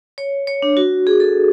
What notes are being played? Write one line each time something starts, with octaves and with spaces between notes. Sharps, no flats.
C#5
C#5
D4
F#4
G#4
A4